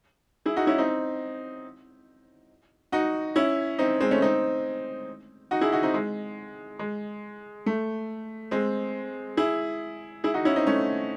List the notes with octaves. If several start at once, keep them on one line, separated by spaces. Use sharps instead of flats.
E4 G#4
D#4 F#4
C#4 E4
C4 D#4
D#4 F#4
C#4 E4
C4 D#4
G#3 C4
A3 C#4
C4 D#4
D#4 F#4
E4 G#4
D#4 F#4
C4 D#4
G#3
G#3
A3
G#3 C4
E4 G#4
E4 G#4
D#4 F#4
C#4 E4
C4 D#4
A3 C#4